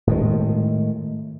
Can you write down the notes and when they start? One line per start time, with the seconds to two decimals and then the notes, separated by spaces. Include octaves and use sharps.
0.07 A2 D#3 G#3